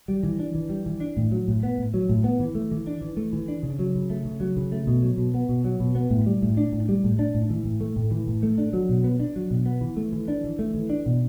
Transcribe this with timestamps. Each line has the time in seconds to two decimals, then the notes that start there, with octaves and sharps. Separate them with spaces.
0.08 G3
0.23 E3
0.39 D4
0.55 E3
0.69 G3
0.86 E3
1.01 D4
1.17 A2
1.32 F#3
1.48 A2
1.63 B3
1.78 A2
1.94 F#3
2.09 A2
2.24 B3
2.40 E3
2.55 A3
2.72 E3
2.87 D4
3.01 E3
3.17 A3
3.33 E3
3.48 D4
3.63 C#3
3.79 F#3
3.95 C#3
4.10 A3
4.25 C#3
4.40 F#3
4.57 C#3
4.72 A3
4.87 B2
5.02 F#3
5.18 B2
5.34 B3
5.49 B2
5.64 F#3
5.80 B2
5.95 B3
6.10 A2
6.26 G3
6.42 A2
6.57 D4
6.72 A2
6.89 G3
7.04 A2
7.19 D4
7.35 A2
7.50 E3
7.65 A2
7.81 A3
7.96 A2
8.11 E3
8.27 A2
8.43 A3
8.58 D4
8.73 F#3
8.89 B2
9.04 B3
9.20 D4
9.36 F#3
9.51 B2
9.66 B3
9.81 E3
9.97 A3
10.12 E3
10.28 D4
10.44 E3
10.59 A3
10.74 E3
10.90 D4
11.06 B2